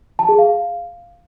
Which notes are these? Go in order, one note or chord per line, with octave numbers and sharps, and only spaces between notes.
A5
G#4
F5